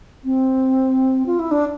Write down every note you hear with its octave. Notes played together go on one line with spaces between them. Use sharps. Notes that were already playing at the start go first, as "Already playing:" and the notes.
C4
F4
E4
D4